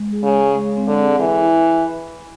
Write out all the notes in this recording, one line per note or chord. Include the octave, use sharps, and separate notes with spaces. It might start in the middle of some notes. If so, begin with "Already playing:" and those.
Already playing: G#3
G#4
C#3
G#4
G#3
C4
D3
G#4
E3 E4
E4